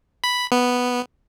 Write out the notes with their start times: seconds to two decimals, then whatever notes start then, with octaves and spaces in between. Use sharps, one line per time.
0.24 B5
0.52 B3